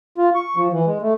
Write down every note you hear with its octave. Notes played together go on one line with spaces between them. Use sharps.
F4
C#6
F3
E3
G#3
A3